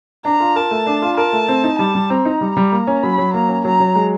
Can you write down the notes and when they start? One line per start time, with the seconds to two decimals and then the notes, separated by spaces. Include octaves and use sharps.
0.25 D4 A#5
0.40 F4
0.56 A#4 A5
0.71 A3
0.86 D4
1.02 F4
1.17 A#4 A5
1.33 A3
1.48 C4
1.64 D#4
1.79 G3 A5
1.95 G3
2.10 C4 A#5
2.25 D#4
2.41 G3
2.57 G3
2.72 A#3
2.87 C#4
3.03 F#3 B5
3.18 F#3
3.33 A#3 A#5
3.49 C#4
3.64 F#3 A#5
3.80 F#3
3.95 G#3